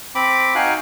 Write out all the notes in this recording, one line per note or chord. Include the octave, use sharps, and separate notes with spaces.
C4 B5 D6
D#4 F#4 F5 G5 G#5 F#6